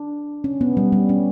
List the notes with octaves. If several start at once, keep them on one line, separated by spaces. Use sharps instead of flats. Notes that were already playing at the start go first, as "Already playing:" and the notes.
Already playing: D4
C#4
B3
G3
G3
C#4